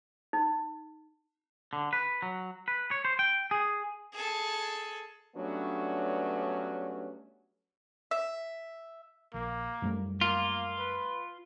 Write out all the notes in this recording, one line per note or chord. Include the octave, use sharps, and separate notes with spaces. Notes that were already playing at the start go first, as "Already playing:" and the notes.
D#4
D3
B4
F#3
B4
C#5
C5
G5
G#4
G#4 A4
G2 F#3 A3 B3 C#4 D4
E5
A#1 A#3
F#2 G3 A3
A#3 F4
B4